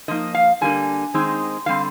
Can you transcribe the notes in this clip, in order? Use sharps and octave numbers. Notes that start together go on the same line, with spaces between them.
D3 F3 A#3 D#4 D#5
F5
D3 G3 A#3 D4 G#5
D#3 G#3 C4 D#4
D3 G3 C4 F5